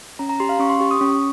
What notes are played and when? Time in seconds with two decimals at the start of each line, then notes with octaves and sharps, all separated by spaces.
0.19 C#4 A#5
0.29 A#5
0.40 G4 C6
0.49 F5
0.59 C#4 C#6
0.69 C6
0.80 G4 C#6
0.91 D#6
1.00 C#4 C#6